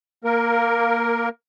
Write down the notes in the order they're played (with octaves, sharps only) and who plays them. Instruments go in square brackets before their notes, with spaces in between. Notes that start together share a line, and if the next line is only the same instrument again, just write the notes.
[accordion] A#3 A#4